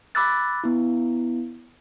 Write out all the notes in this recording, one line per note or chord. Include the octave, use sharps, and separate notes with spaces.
B5 D6 E6 F#6 A6
B3 E4